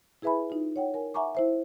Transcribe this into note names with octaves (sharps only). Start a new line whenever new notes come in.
E4 G#4 B4 E5 G#5 B5
D#4 F4
C#5 F#5 G5
A#4 G#5
E5 F#5 G#5 A#5 C#6 D6
E4 C5 E5